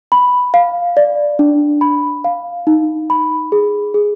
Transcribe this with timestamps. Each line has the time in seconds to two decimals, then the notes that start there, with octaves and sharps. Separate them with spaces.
0.12 B5
0.54 F5
0.97 D5
1.39 D4
1.81 B5
2.24 F5
2.67 D#4
3.10 B5
3.52 G#4
3.94 G#4